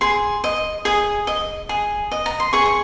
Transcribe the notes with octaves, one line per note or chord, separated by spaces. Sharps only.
G#4 C6
D#5
G#4 D#6
D#5
G#4
D#5
A#5
C6
G#4 C#6
C#6